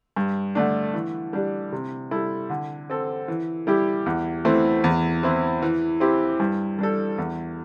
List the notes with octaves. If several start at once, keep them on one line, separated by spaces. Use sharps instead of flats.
G2
D3 A3 D4
E3
G3 D4
C3
G3 E4 A4
D3
C4 A4
E3
G3 E4 G4
E2
E3 A3 C4 E4
E2
E3 C4 E4
E3
C4 E4 G4
G2
G3 D4 A4
E2